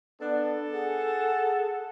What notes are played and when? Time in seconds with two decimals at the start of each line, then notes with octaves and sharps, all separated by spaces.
0.21 B3 D4 A4
0.73 G#4 F#5